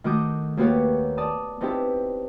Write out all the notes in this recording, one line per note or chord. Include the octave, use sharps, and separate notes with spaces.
D#3 A3 F#4 D6 D#6 G6
D#2 A#3 B3 F#4 G4 C#5
D5 A5 D#6
B3 C4 D#4 E4 G4 A5